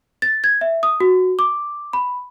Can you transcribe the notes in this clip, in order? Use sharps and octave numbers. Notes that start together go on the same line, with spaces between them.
A6
G#6
E5
D#6
F#4
D6
B5